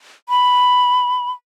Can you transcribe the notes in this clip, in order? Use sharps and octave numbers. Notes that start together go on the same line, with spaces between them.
B5